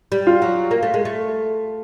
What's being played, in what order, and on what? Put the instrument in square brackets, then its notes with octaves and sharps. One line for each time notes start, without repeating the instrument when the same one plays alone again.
[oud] G3
[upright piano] F4
[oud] F#3
A#3
A3
G#3
A3